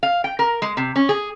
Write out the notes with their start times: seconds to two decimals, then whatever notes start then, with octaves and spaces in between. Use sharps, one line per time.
0.03 F5
0.24 G5
0.39 A#4
0.62 G#3
0.77 C3
0.96 C#4
1.09 G#4